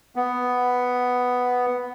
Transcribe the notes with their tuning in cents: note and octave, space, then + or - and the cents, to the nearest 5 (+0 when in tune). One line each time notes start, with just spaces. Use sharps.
B3 +5